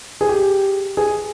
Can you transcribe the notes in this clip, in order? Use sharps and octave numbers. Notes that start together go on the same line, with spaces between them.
G#4
G4
G#4